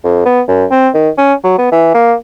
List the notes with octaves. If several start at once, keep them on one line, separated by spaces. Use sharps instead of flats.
F2
B3
F#2
C4
D#3
C#4
F#3
B3
E3
A#3